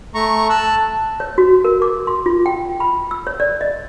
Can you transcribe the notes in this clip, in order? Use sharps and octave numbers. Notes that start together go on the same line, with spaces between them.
A3 A#5 C#6
A5 E6 F#6
C#5
F#4
A#4
D6
C6
F4
G5
B5
E6
C#5
D5
D#5